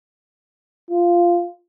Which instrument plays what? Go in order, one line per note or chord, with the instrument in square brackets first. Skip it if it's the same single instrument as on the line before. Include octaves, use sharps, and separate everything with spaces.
[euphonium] F4